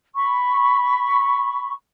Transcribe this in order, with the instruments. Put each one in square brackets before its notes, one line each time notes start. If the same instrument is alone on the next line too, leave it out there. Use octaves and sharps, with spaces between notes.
[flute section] B5 C#6